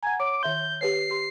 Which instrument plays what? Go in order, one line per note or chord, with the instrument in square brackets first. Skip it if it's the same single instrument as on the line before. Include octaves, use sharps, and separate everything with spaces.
[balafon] F#5 A#5 [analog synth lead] G#5
[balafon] C#5 [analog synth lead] D6
[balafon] D#3 E5 C6 [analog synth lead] G6
[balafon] G4 B4 C#5 [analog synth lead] C7
[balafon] G4 C6